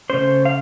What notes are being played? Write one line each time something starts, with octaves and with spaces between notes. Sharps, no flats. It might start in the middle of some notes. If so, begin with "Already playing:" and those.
C#3 A3 C#4 C5
F5